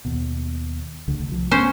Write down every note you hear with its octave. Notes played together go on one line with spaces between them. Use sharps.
D#2 B2
C#2 D3 A3
C2 F3
A3 B3 C#4 D4 C5